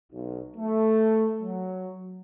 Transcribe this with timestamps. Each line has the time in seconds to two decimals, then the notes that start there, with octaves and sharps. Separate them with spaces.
0.12 B1
0.57 A3
1.41 F#3